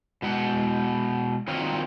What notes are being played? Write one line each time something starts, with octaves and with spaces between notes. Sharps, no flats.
B2 G#3 F#5
A#2 D#3 F#3 C4 C#5 F5